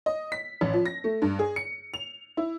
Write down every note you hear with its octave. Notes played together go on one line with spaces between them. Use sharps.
D#5
B6
A1
F3
A#6
A3
G2
G#4
C#7
F7
E4